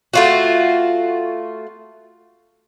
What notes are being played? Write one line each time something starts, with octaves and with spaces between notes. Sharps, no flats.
A3 F4 F#4